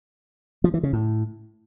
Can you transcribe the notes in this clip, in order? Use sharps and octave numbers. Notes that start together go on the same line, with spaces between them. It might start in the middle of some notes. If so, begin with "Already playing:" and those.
F3
E3
C#3
A2